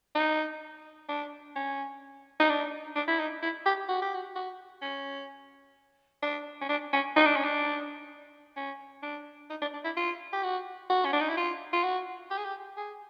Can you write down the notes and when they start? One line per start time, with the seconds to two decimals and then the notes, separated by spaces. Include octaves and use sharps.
0.15 D#4
1.08 D4
1.55 C#4
2.39 D#4
2.49 D4
2.95 D4
3.08 E4
3.19 D#4
3.42 E4
3.66 G4
3.88 F#4
4.01 G4
4.14 F#4
4.35 F#4
4.82 C#4
6.22 D4
6.61 C#4
6.69 D4
6.93 C#4
7.16 D#4
7.25 D4
7.36 C#4
7.44 D4
8.56 C#4
9.02 D4
9.50 D#4
9.61 D4
9.73 D4
9.84 E4
9.96 F4
10.33 G4
10.43 F#4
10.90 F#4
11.05 C#4
11.13 D4
11.20 D#4
11.29 E4
11.37 F4
11.72 F4
11.83 F#4
12.30 G4
12.37 G#4
12.44 G4
12.77 G#4